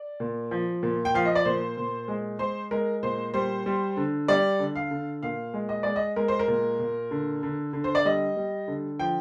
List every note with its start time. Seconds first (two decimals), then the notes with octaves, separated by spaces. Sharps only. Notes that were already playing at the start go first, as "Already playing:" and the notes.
Already playing: D5
0.20 A#2
0.51 F3
0.83 A#2
1.05 G5
1.14 F3 F5
1.25 D#5
1.35 D5
1.45 A#2 C5
1.77 A#2
2.08 G#3
2.39 G#3 C5
2.71 G#3 A#4
3.03 A#2 C5
3.34 G3 C5
3.66 G3
3.97 D3
4.28 G3 D5
4.59 D3
4.75 F5
4.91 D3
5.23 A#2 F5
5.54 G#3
5.69 D#5
5.83 G#3 D5
5.96 D#5
6.16 G#3 A#4
6.28 C5
6.39 A#4
6.48 A#2
6.79 A#2
7.11 D3
7.43 D3
7.73 D3
7.84 C5
7.95 D5
8.05 G3 D#5
8.37 G3
8.68 D3
8.99 F3 G5